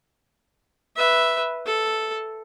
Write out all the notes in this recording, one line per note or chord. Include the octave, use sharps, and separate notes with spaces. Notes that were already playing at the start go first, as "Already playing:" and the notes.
B4 E5
A4